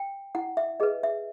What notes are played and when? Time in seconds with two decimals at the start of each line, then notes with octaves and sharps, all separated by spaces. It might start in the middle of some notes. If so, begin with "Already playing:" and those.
Already playing: G5
0.35 E4 F#5
0.57 E5
0.80 G#4 B4 D#5
1.03 E5